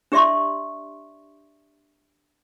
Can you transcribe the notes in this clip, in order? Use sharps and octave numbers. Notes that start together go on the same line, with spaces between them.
D4 G4 D5 E5 C6 C#6